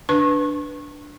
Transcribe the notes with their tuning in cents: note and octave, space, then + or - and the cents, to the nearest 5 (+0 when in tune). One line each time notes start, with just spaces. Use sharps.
D4 +0 B4 +0 C#6 -30